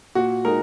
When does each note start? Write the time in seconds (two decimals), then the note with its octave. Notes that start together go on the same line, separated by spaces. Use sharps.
0.15 A#2 F#4
0.45 G#3 D#4 A#4